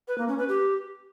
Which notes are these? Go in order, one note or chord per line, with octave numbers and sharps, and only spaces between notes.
B4
A#3
C#4
B4
G4